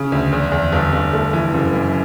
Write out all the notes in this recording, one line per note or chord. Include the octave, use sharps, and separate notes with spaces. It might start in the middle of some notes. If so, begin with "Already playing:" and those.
Already playing: C#3
D2
E2
E2
G1
G1
A3
E3
F#1
F#2